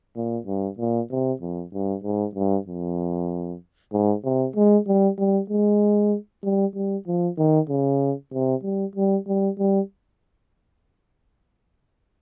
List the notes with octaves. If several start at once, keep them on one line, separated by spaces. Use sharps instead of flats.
A#2
G2
A#2
C3
F2
G2
G#2
G2
F2
G#2
C3
G#3
G3
G3
G#3
G3
G3
F3
D#3
C#3
C3
G3
G3
G3
G3